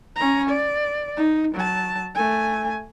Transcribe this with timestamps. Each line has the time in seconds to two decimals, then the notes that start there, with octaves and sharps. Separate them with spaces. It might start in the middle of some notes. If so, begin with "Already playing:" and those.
0.17 C#4 A#5
0.49 D5
1.17 D#4
1.55 F#3 A5
2.15 A3 G#5